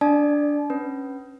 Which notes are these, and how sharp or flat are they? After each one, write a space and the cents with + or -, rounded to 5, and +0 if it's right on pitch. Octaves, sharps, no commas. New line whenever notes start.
D4 -10 D5 +10 A5 -35
C#4 -20 B4 +0